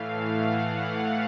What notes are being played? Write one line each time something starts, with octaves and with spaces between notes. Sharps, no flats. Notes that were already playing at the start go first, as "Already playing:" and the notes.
Already playing: A2 E3 A3 F5
F#5